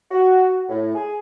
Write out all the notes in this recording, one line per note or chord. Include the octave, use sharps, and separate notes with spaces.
F#4
A2
G#4